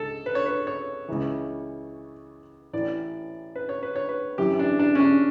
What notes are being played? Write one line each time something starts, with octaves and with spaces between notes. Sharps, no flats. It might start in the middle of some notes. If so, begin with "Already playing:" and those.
Already playing: C#2 A4
B4
C#5
B4
C#5
C#2 C#3 E3
A1 A2 E3 D5
B4
C#5
B4
C#5
B4
F#2 E3 G4
D4
D4
C#4
D4